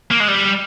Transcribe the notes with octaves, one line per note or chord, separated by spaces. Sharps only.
A#3
G#3
G3